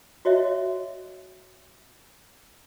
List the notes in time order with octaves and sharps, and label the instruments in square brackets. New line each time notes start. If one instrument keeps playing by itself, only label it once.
[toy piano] F#4 C#5 D#5 E5